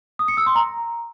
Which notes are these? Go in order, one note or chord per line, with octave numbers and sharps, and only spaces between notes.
D#6
C#7
E6
C6
A#5